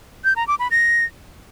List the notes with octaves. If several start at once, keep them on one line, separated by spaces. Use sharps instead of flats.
G6
A#5
D6
B5
A#6